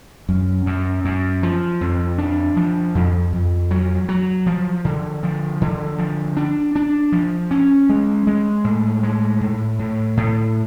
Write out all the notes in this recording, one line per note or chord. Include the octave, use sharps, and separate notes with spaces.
F#2
F#2
F#2
F3
F2
D4
F3
F2
F2
F#3
F#3
F3
D3
F3
D3
F3
D4
D4
F3
C#4
G#3
G#3
A2
G#3
A2
A2
A2